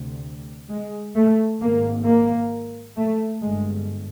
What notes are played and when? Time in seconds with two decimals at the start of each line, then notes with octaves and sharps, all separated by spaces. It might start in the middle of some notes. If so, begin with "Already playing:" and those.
Already playing: D2 C3
0.69 G#3
1.15 A3
1.60 G#1 G#2 A#3
2.06 A#3
2.97 A3
3.42 G1 G2 G#3